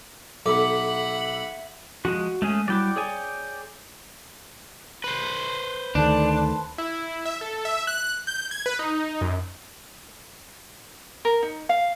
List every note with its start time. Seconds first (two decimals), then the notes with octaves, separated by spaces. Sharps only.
0.46 B1 A4 E5 F#5 B5 D6
2.05 F3 G#3 F#4
2.42 G#3 A3 C#4 G#4 G#5
2.68 F#3 G3 E4 D5 G5 D6
2.96 G#4 C#5 G#5
5.04 B4 C5
5.95 D2 D#3 A3 D4 A5
6.78 E4
7.25 E5
7.41 A4
7.65 E5
7.87 F#6
8.27 G6
8.51 G#6
8.66 B4
8.79 D#4
9.21 F#2
11.25 A#4
11.43 D#4
11.69 F5